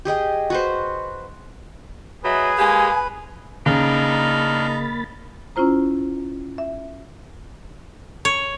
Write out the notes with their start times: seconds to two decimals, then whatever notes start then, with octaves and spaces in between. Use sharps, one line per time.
0.05 G4 G#4 D#5 G5
0.50 F#4 B4 C5
2.24 F#3 D#4 G#4 B4 E5
2.58 G#3 A#3 G4 G#5
3.66 C#3 A#3 D4 D#4 A#4 B5 A6
5.56 C#4 E4 F4 C5 A#5
6.58 E5
8.25 C#5